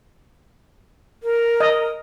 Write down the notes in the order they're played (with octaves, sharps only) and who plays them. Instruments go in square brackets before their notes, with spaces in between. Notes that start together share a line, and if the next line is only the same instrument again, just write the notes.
[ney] A#4
[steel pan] D#5